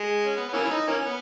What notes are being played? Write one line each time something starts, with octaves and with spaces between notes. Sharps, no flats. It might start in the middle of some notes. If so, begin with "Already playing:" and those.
Already playing: G#3
C#4
B3
B3
E3 A#3 C#4
E4
D#4
E3 A#3 C#4
B3